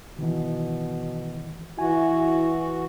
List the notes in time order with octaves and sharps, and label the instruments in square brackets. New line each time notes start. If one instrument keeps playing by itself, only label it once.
[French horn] B2 [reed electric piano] D#3 E3
[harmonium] E3 F#4 [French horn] E4 [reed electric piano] G#5